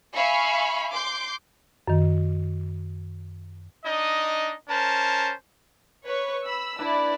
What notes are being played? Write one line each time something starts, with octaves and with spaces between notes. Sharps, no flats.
E5 F5 G#5 B5 C#6
C6 D6 G6
F#2 D#3
D4 D#4 D#5
C#4 A#4 C5 A5
B4 C#5 C#6
B5 E6
D4 E4 B4 D5